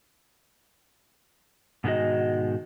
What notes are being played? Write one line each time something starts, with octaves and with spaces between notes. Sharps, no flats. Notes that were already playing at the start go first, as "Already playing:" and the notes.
G#2 B2 D#3 G#3 F#4 D#5